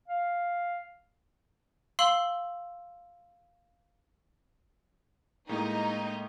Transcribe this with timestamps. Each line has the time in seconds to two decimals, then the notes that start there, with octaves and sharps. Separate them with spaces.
0.08 F5
1.99 F5 C6 E6 F#7
5.49 A2 G#3 A#3 D#4